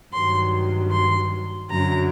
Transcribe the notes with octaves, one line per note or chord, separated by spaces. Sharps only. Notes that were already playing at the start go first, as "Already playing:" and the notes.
G2 D#3 F#3 C6
C6
F#2 D3 F#3 A#5